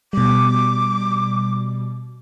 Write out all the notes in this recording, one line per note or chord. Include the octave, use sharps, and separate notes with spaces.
B2 G3 D6